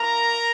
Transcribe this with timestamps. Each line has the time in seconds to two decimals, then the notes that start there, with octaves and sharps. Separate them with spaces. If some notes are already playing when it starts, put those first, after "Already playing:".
Already playing: A#3 E4 A#4 A#5